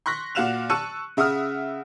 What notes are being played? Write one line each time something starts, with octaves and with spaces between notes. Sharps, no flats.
C6 C#6 F#6 A#6 B6
A#2 F#4 F5 F#6 E7 F7
A5 C#6 E6 F#6 C#7 D#7
C#3 E5 F#5 D#6 F6